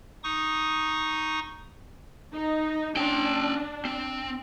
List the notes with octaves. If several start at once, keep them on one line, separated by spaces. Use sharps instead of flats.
D#4 C#6 D#6
D#4
C#4 D4 G5
C4